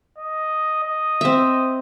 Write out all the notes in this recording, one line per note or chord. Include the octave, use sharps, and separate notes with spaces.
D#5
D#5
C4 E5